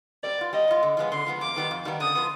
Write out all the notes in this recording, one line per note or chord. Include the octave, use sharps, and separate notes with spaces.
G3 D5
B3 F4
G3 D#5
B3 F4
D3
F3 G#3 B3
D3 C6
F3 G#3 B3
F2 D6
D#3 G3 B3 D#4
F2
D#3 G3 B3 D#4
D3 D#6
F3 B3